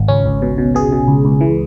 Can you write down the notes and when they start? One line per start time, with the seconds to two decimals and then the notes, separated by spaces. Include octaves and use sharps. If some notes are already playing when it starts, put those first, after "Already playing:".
Already playing: G#1
0.08 C#2 C#4
0.26 C#2
0.42 B2
0.58 B2
0.75 B2 G#4
0.92 B2
1.08 C#2
1.25 C#2
1.41 E3